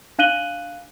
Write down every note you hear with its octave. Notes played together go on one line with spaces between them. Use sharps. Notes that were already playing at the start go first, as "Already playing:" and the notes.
D4 F5 F#6 D#7 F#7 G7